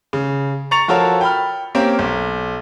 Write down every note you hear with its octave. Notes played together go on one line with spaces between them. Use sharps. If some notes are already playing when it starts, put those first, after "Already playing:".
C#3
A#5 C#6 A6 C#7 F7
F3 F4 F#4 A4 A#4 C#5
G5 B5 F6
A#3 C4 C#4 G4 A#4
B1